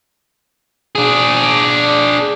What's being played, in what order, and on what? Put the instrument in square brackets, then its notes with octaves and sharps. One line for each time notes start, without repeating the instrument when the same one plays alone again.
[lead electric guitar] D4 G#4